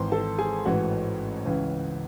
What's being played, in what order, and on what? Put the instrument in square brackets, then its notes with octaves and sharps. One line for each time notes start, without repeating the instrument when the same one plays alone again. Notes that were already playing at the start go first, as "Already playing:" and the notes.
Already playing: [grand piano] G#1 G#2 E3 C5 C6
A4 A5
G#4 G#5
A1 G#2 E3 F#4 F#5
C#2 C#3 E3